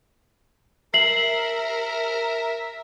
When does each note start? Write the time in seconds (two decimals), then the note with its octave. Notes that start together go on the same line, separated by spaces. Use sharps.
0.94 A#4 E5 C7 F#7